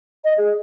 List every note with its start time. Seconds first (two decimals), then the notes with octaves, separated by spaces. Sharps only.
0.24 D#5
0.38 G#4